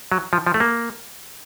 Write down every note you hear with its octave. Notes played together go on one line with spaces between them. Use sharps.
F#3
F3
F3
A3
A#3